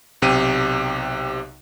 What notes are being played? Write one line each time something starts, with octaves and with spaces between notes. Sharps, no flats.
B1 C3 G4 D#7